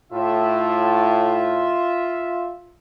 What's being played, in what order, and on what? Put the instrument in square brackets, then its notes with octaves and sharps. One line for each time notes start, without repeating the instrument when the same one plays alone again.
[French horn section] A2 [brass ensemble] F4 E5